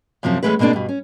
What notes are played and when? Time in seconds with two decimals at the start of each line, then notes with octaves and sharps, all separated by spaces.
0.23 F#2 C3 F3 C4
0.43 E2 A#2 G#3 A3 C#4 B4
0.59 B2 G#3 A#3 C4 D4
0.73 G2 B2
0.89 C#4